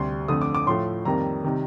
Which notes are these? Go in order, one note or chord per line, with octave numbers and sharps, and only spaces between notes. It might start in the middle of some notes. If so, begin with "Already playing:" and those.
Already playing: D2 C3 G3 C6
F2 D3 A3 D#6
D6
D6
A2 F3 A3 C6
F2 D#3 G3 A#3 A#5
C3 D#3 G3